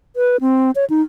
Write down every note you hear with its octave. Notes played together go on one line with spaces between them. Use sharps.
B4
C4
C#5
D#4